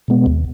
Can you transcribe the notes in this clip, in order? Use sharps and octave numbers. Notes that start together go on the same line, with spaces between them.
B2 G#3 B3
D#2